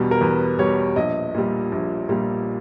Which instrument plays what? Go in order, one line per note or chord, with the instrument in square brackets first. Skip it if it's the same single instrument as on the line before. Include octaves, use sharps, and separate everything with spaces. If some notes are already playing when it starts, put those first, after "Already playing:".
Already playing: [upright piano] E2 B2 G3
A#4
E2 B4
B2 G3 C#5
A#1 D#5
A#2 G3
A#1
A#2 G3